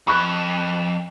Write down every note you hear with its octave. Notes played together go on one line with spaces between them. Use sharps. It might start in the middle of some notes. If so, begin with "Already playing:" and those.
F2 B5 C#6 F#6